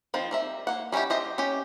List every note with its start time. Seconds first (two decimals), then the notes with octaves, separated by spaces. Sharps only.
0.14 D#3 F3 C4 F4
0.31 G3 A#4 E5
0.67 A#3 F#5
0.92 G3 C#4 D#4 E4 G4
1.10 G4 C5 D#5 E5
1.38 C#4 G4